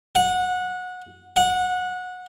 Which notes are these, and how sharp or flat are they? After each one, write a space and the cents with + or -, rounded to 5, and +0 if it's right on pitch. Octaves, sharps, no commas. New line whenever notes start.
F#5 -20
F#5 -20